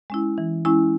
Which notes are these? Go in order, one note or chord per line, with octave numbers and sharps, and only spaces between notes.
G#3 C#4 E4
E3
G#3 C#4 E4